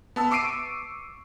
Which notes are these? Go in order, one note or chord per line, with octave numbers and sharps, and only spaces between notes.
B3 A5 E6
C#6 D6 E6 C7 D7 D#7